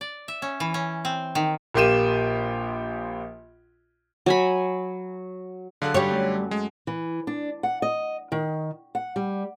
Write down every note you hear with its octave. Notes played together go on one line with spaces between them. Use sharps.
D5
E5
C#4
E3
C#4
C4
D#3
A#1 A#3 F4 G4 D#7 E7
F#3 G#5 B5
D3 F#3 G#4 A4 F5 F#6
F#2 G3 C#5 G5
F#3 A3 C#4
G#3
E3
D4
F#5
D#5
D#3
F#5
G3